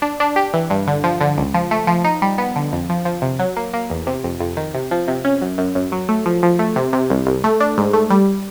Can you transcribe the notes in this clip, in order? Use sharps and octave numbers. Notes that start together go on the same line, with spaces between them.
D4
D4
G4
E3
G2
D3
F3
D3
C#2
F3
A3
F3
D#4
G3
B3
D3
F2
F3
F3
C3
F#3
A#3
A#3
E2
C3
F2
F2
D#3
C3
F3
C3
C#4
F#2
F#2
F#2
F#3
A3
F3
F3
A3
C3
C3
C2
C2
A3
D4
G#2
A3
G3